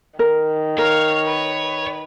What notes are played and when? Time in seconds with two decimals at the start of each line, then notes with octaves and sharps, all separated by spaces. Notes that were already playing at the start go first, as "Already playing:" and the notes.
0.19 D#3 A#4
0.78 A#4 C#5 F5
1.26 B4